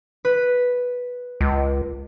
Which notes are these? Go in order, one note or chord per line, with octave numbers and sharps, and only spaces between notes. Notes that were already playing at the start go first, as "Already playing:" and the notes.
B4
C#2